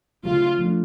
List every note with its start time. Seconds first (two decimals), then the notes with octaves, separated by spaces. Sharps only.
0.23 C#3 F#3 A3 F4
0.59 F3 A3 D4